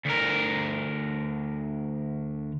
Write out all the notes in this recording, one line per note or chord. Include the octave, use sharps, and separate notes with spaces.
D2 A#4